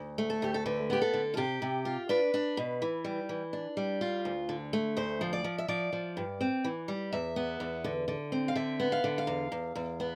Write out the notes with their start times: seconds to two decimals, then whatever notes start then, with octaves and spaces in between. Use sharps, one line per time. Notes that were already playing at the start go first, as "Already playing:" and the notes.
Already playing: D2
0.18 A3
0.30 A4
0.42 D2 G4
0.54 A4
0.66 D3 B4
0.90 B3 G4
1.02 A4
1.14 D3
1.34 F4
1.37 C3 G4
1.62 C3
1.85 F4
2.09 D4 B4
2.34 D4
2.57 B2
2.82 E3
3.05 G3
3.29 E3
3.53 D4
3.77 G3
4.01 F4
4.25 D2
4.49 D3
4.73 A3
4.97 D2 C5
5.21 F3
5.33 D5
5.44 F3
5.58 E5
5.68 F3 D5
5.93 F3
6.17 G2
6.41 C4
6.64 E3
6.88 G3
7.12 E2 E5
7.36 B3
7.60 E2
7.84 D3
8.08 D3
8.32 C4
8.48 F5
8.56 D3 E5
8.80 B3
8.92 F5
9.04 D3
9.18 F5
9.27 E2
9.52 E2
9.75 E2
10.00 B3